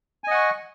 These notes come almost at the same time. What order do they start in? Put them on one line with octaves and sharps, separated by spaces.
G#5 D#5 F#5 C#6